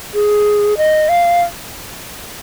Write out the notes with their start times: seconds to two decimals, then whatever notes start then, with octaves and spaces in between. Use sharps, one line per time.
0.15 G#4
0.77 D#5
1.09 F5